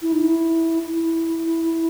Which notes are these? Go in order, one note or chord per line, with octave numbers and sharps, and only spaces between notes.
E4
D#4
E4
E4